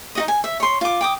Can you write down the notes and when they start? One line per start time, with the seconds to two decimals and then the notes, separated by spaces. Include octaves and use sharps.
0.15 D#4 F#4 D#5
0.28 G#5
0.44 E5
0.60 C#5 C6
0.81 F4 D6
1.01 G5 D6 D#6